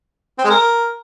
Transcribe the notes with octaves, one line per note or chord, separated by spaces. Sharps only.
C4
G#3
A#4